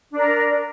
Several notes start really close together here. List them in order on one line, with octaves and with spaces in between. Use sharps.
D4 D5 A#4